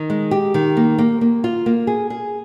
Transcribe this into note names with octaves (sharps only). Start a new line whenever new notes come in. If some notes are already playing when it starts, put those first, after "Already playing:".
Already playing: D#3
G#3
G4
D#3
A#3
A#3
A#3
F4
A#3
G#4
G#4